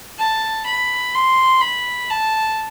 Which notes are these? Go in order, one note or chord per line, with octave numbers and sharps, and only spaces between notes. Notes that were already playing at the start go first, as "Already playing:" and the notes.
A5
B5
C6
B5
A5